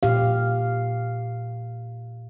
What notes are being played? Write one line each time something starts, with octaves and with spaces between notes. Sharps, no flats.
A#2 G4 F5